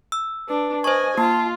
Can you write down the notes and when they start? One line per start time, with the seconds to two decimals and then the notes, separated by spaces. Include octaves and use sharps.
0.12 E6
0.49 D4 B4
0.84 C5 D#5 G#5 C#6
1.18 A#3 F4 A5